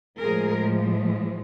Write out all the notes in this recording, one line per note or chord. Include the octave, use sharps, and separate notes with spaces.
A2 F3 G#3 G#4 A#4